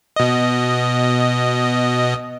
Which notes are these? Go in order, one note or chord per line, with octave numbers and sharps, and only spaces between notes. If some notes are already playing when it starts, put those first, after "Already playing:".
B2 D#5